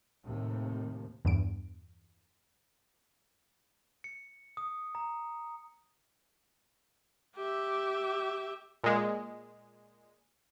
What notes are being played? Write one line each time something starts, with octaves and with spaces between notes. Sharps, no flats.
D#2 A2 C3
E2 G2 D7
C#7
D#6
A#5
G4 E5
A#2 G#3